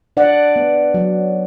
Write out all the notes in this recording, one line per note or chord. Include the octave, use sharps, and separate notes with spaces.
D4 D5 F#5
B3
F#3